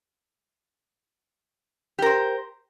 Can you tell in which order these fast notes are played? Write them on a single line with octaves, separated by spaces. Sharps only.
G4 A#4 C5